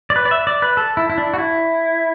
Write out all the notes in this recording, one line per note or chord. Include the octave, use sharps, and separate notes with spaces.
D5
B4
D5
E5
D5
B4
A4
E4
E4
D4
F#4
E4